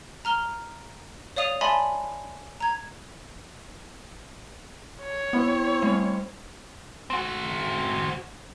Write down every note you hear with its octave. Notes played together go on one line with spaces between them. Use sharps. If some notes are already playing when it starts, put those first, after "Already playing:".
A#5 F6 G7
C#5 D5 F5 D#6 D#7 F7
D5 E5 G#5 A5 B5 C6
A#5 G#6
C#5
B3 C4 E4
G3 A3 C4 F5
C4 F#4